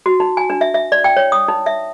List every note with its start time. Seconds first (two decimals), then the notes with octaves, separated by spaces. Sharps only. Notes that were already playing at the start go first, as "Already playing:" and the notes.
0.06 F#4
0.20 D#4
0.37 G#5
0.50 D4
0.61 E5
0.74 E5
0.92 D5
1.04 G5
1.17 C#5
1.32 D#6
1.48 D#4
1.66 E5